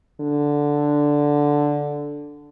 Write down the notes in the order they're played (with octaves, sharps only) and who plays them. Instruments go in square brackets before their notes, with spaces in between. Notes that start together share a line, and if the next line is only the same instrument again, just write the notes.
[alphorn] D3